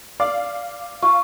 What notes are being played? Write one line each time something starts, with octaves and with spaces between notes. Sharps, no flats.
D5 F5 D6
F4 C#6